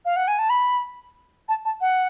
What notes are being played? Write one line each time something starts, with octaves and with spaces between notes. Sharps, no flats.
F5
F#5
G#5
A5
B5
A5
A5
F#5